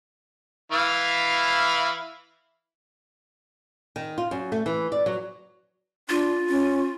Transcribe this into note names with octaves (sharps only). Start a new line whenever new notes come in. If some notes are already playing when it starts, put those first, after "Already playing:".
E3 E4 F5
D#3
F4
F#2
A3
E3
D5
F#3
D4 F4
C#4